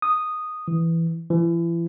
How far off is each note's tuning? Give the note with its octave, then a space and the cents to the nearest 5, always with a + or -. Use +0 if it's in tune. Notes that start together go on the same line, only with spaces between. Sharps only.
D#6 -5
E3 +5
E3 +35